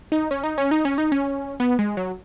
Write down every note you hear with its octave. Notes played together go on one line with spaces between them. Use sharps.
D#4
C#4
D#4
C#4
D#4
C#4
D#4
C#4
B3
G#3
F#3